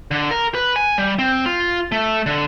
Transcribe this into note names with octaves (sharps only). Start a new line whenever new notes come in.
D3
A#4
B4
G#5
G3
C4
F4
A3
D3